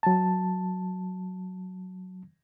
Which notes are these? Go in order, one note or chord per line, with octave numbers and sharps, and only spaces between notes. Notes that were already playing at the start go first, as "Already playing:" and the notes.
F#3 A5